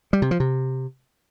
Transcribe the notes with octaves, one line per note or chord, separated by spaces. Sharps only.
G3
C3
F3
C3